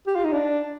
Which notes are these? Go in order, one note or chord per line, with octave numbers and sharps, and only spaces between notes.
G4
F4
D#4
D4